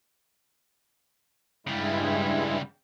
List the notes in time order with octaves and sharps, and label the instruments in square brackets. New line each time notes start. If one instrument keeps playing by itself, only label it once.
[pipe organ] G2 G#3 E4 [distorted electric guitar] C#3 G3